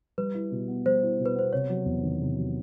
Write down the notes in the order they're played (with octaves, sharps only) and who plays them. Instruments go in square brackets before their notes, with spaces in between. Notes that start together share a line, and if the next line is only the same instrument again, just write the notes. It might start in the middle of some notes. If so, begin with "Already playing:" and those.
[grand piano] G3 [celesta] B4
[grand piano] E4
B2
B3
[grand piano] G3 [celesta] C5
[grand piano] E4
B2
[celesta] B4
[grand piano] B3 [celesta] C5
[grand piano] C3 [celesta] C#5
[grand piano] F#3
E2
D#3
C3
F#3